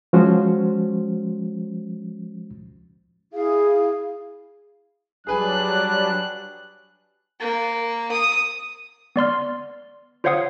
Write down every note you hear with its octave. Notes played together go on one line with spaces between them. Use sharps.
F3 G#3 C#4 F#4 C5
E4 G#4 F5
F#3 G3 D4 G#4 B4 G#5 F#6
A#3
D#6
B3 D5 C6 F6
F4 C5 C#5 F5 F#5 D#6